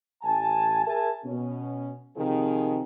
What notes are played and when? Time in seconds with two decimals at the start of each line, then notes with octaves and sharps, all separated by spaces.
0.22 A1 G#5 A5
0.85 G#4 A#4 E5 G#5 A5
1.25 B2 C#4
2.17 C3 D#3 F3 G#4